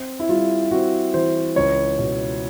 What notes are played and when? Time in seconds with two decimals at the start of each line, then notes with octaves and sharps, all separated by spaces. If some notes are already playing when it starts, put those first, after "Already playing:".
Already playing: C4
0.20 E4
0.29 G3 F4
0.71 C4 F#4
1.14 E3 C5
1.56 C#2 C#5
1.99 B2